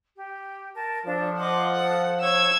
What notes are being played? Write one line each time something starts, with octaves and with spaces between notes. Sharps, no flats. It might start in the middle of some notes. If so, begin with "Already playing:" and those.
G4
A#4 A5
F3 D4 A4
D#5 F#5 C6 D6
A4 D#6
C#5 E6 G#6